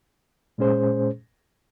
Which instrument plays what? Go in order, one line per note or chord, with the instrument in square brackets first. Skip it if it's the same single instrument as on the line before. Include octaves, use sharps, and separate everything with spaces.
[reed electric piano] A#2 G#3 C#4 G#4 C5